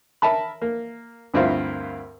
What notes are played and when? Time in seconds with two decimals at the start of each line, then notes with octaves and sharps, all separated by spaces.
0.22 A#4 E5 A5 B5
0.61 A#3
1.34 D2 G2 C4 E4 F4 A#4